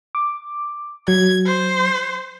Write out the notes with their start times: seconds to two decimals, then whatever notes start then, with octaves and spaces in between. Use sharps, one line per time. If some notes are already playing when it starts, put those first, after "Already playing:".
0.15 D6
1.08 F#3 G#6
1.46 C5